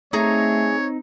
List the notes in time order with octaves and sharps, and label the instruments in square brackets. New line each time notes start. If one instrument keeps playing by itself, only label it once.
[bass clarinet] A3 [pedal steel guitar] C4 D#4 [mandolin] G#4 A#5 [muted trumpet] C#5